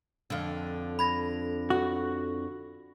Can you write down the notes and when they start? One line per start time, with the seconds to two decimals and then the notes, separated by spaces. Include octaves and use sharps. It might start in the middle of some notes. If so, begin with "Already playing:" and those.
0.30 F2 D3
0.99 B5 G#6 A#6
1.70 F#4